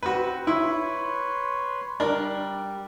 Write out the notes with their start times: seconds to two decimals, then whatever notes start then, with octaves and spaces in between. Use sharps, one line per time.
0.03 C4 F#4 B4
0.47 E4 B4 C#5 C6
2.00 G3 D4 A#4